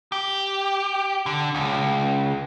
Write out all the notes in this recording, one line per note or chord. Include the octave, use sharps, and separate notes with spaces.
G4
D3
C#2